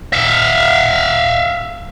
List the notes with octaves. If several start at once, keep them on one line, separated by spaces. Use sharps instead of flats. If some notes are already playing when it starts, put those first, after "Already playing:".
E5 F5